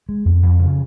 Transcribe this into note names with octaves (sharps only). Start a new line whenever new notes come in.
G#3
F2
F2
C#3